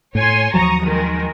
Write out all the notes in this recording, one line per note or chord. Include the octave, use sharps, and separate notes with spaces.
A2 C#5 G#5 C6
D#2 F3 F#3 A#5 C#6 D#6
D#3 G#3 A#4